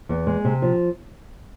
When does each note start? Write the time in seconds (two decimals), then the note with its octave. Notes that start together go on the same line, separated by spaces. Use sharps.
0.09 E2
0.27 G#3
0.45 C3
0.62 F3